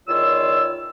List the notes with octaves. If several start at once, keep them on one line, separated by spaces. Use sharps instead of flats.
E2 D#3 F4 C#5 E6